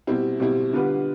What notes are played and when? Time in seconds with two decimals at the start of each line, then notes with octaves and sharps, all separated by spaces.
0.07 B2 G3 C4 E4
0.40 B2 G3 C4 E4
0.73 D3 G3 B3 F4 B4